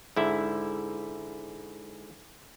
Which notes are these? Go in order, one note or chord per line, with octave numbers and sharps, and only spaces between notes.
G#2 D3 E4 E5